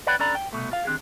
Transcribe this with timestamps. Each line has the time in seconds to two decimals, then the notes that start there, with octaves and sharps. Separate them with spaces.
0.07 B4 C#5 D5 F#5 G5 B5
0.19 C#4 D4 A4 D5 A#5 B5
0.35 G5
0.53 C2 F#2 B2 A3
0.72 F4 F5
0.85 D#3 C4 D4 G4 G#4